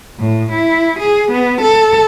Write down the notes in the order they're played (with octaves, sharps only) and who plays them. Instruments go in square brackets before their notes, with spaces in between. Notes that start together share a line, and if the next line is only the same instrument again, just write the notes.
[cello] A2
E4
G#4
B3
A4